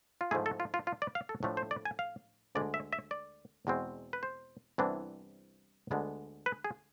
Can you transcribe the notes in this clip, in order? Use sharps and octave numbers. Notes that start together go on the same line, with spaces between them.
F4
G#2 F3 A3 E4 G#4
A4
F4
F4
F4
D5
F5
A4
A2 F3 A3 D4
C5
D5
G#5
F5
D2 D3 G#3 D5
E5
E5
D5
E2 B2 G#3 C4
B4
C5
C2 C3 E3 B3 D4
D2 D3 G#3 B3
B4
G#4